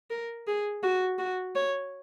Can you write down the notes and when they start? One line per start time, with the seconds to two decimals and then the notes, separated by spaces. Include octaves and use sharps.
0.10 A#4
0.47 G#4
0.83 F#4
1.19 F#4
1.55 C#5